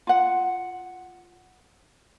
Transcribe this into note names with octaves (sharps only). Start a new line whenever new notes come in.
F4 F#5